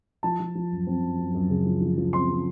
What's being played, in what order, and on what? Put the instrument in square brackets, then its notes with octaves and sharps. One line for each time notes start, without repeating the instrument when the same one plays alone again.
[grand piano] F3 A5
F3
F3
F#2
C4
F#2
F#2
F#2
C#3
F3
F3
F3
C4 C6
C4